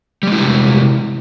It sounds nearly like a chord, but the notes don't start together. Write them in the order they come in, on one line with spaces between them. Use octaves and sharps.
G3 G#3 E4 F#4 C3